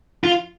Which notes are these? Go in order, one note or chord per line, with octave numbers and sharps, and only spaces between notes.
F4